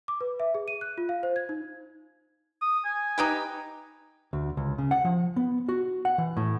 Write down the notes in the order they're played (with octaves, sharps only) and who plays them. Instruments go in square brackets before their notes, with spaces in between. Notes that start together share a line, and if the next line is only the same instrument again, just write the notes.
[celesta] D6
B4
E5
G#4
D#7
F#6
F4
F5
C5
G#6
D#4
[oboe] D#6
G#5
[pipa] D#4 G4 B4
[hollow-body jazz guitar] D2
C#2
C#3
F#5
F3
B3
F#4
F#5
E3
A2